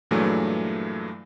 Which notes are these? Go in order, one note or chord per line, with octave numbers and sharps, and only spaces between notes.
G2 A#2 E3 F#3 G#3 A3